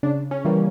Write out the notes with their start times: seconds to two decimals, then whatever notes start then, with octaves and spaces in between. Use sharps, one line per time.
0.03 C#3 D4
0.31 C#4
0.45 E3 G3 A#3